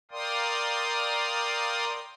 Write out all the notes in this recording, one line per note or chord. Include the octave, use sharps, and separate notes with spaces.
A#4 D5 F5 G5 C6 D#6